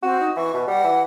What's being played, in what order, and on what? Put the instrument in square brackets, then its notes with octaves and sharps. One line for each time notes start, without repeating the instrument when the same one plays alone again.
[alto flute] C4 [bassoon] F#4
[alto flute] D#4
[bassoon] E3 [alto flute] C#6
[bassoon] B2 [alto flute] B4
[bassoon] G3 [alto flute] F#5
[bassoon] E3